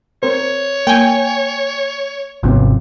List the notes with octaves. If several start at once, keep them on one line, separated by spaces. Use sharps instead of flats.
C4 A#4 C5 C#5
A#3 G5 G#5
G#1 C3 F3 B3 C#4